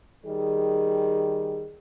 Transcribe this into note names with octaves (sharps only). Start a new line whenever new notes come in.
D#3 G3 G#4